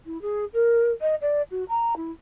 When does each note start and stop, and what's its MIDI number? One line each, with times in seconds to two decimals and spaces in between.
0.06 0.21 64
0.22 0.45 68
0.53 0.90 70
1.01 1.15 75
1.21 1.42 74
1.51 1.64 66
1.69 1.94 82
1.96 2.11 64